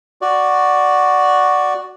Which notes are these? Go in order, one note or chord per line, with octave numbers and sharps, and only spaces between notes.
F#4 D5